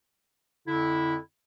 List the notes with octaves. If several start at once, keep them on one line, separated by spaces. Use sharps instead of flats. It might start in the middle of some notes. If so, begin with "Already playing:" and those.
F2 D3 E4